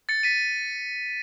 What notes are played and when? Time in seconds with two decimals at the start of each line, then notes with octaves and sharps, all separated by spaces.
0.09 A6 C#7
0.23 B6 D#7